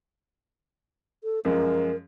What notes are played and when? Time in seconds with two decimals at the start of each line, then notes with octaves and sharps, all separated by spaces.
1.24 A4
1.45 F#2 F3 G#3 A#4